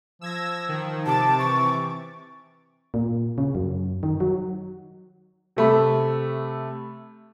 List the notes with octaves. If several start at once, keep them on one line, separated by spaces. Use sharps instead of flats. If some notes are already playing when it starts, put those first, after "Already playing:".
F3 E6 G#6 A#6
D#3
C3 A5 D6 A6
E3 C#6
A#2
C#3
F#2
D#3
F#3
C3 A3 B5